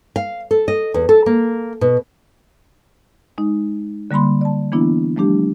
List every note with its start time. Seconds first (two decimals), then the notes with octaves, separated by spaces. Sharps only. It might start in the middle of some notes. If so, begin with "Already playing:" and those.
0.16 F5
0.51 A4
0.68 D#5
0.94 E2
1.09 A4
1.26 A#3
1.81 B2
3.38 G#3 D#4
4.11 D3 G3 A#3 B5 C6
4.41 D5 A5
4.72 E3 A#3 B3 D4 E4
5.16 F3 G3 A3 D4 G4